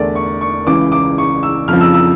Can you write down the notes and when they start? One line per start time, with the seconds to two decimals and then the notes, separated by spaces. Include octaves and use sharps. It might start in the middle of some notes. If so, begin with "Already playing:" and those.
Already playing: E2 D3 A3 A#4 D5
0.15 C#6
0.41 C#6
0.66 C#2 C#3 E3 D6
0.92 D6
1.18 C#6
1.43 E6
1.68 F2 C#3 F3 F6
1.81 E6
1.94 E6